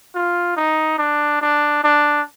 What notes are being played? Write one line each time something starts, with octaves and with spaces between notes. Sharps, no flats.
F4
D#4
D4
D4
D4